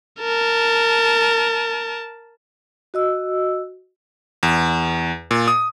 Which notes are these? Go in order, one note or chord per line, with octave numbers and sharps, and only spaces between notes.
A#4 A5
F#4 D#5 E6
E2
A#2
D#6